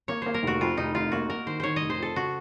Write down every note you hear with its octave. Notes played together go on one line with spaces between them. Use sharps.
A#3 C#5
A#3 C5
A#4
F1 F#4
F2 F4
F1 D#4
F1 F4
A#3 F#4
A#3 A#4
D#3 C5
D#3 C5 C#5
D#5
F1
C5
F2 A4
C#3 F#4